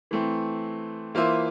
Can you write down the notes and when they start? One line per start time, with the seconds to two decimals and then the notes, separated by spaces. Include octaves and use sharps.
0.11 E3 A3 C4
1.15 E3 A#3 F4 C5 E5